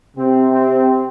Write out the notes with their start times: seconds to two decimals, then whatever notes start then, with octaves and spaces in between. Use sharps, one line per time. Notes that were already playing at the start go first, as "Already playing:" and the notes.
0.17 C3 C4
0.52 C4